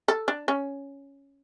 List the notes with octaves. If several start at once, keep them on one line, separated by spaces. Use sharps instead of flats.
A4
D4
C#4